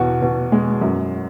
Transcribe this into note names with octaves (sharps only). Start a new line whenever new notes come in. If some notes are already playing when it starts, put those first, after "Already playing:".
Already playing: E2 B2 F#4
B2
G#3
F#2